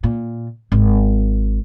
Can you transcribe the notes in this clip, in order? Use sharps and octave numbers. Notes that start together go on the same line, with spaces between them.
A#2
G#1